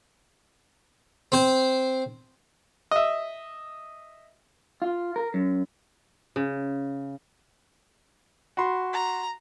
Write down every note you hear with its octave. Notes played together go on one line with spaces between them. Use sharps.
C4 C5
D#5 E5
F4
A#4
F#2
C#3
F#4 B5 C6
A#5